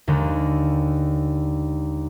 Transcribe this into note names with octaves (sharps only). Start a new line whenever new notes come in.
D#2 D3 D#3 G#3